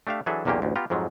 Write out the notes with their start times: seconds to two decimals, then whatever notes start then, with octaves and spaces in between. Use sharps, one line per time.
0.07 A3 D4 G4 E5 F5
0.26 E3 F#3 D4 G#4 A4 E5
0.45 B1 E2 A#2 A#3 C#4 G4
0.62 A1 D2
0.76 B3 F4 G4 A#5
0.90 F2 G#2 F3 F#3